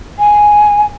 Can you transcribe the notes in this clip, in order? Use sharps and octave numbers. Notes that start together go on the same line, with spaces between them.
G#5